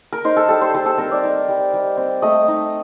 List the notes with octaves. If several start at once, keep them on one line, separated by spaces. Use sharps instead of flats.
A#4
D#4 C5
A4
G3 A4
C5
G3 A4
A4
C4 A#4
D5
D#4
G3
G3
C4
A3 D#5
D#4